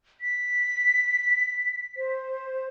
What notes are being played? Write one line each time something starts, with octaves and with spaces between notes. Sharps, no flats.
B6
C5